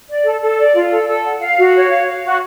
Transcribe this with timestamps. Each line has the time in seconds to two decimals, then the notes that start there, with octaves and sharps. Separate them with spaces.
0.08 D5
0.25 A4
0.42 A4
0.58 D5
0.75 F4
0.92 A4
1.08 A4
1.25 F#5
1.41 F5
1.58 F#4
1.75 C#5
1.91 F5
2.08 F5
2.24 F#4